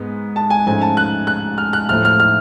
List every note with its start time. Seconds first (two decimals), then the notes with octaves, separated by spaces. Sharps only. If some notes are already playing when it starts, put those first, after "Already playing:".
Already playing: G#2 G#3 B3
0.36 A5
0.50 G#5
0.67 G#2 F3 A3 C#4 G#5
0.82 A5
0.97 F#6
1.27 F#6
1.58 F6
1.73 F#6
1.89 A2 F3 A3 F6
2.05 F6
2.20 F6